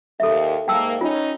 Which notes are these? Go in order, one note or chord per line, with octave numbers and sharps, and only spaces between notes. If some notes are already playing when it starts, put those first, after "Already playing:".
D#2 A4 E5
G#2 A#3 G5 A5 E6
C#4 D#4 F4